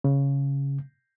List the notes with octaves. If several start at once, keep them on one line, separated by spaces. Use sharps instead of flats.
C#3